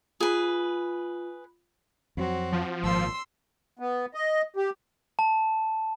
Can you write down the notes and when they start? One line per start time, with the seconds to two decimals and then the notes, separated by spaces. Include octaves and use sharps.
0.21 F4 G#4 B4
2.17 F2 F#3 C4 F#4
2.52 F3
2.84 G#1 A#2 C6 E6
3.79 B3
4.14 D#5
4.56 G4
5.19 A5